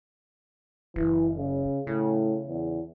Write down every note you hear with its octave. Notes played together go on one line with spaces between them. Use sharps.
F#1 E3
C#3
A2 C#3
E2